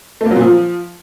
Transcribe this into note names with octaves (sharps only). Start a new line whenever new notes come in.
A3
A#3
F#3
A#2
F3